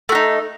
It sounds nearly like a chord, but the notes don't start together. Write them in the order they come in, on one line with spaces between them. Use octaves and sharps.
A3 F#4 D#4